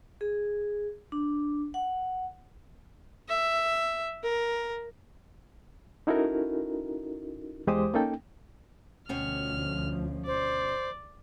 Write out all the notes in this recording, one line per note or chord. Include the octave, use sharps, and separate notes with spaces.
G#4
D4
F#5
E5
A#4
C#4 D#4 E4 F#4 A4 A#4
E2 G#3 G4 C5 D6 D#6
A#3 C#4 D#4 A4 G5
D2 B2 F3 C#4 G5 F6
C5 D5